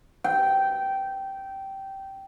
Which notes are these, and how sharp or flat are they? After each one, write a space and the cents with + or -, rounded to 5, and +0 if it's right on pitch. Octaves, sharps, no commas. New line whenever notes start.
G5 -15